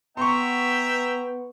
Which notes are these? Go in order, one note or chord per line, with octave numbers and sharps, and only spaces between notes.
B3 E5 G5 A#5 C6 C#6